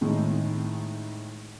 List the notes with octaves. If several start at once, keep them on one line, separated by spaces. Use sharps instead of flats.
A2 D#3 G#3